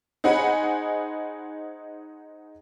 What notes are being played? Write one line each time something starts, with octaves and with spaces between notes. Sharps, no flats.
D#4 G#4 C5 F#5 G#5 B5